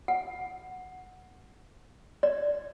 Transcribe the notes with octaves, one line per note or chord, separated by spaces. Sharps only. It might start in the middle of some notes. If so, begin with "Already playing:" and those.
F#5
D5